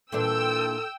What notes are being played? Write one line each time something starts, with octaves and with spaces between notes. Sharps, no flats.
A#2 E3 D4 A4 G5 E6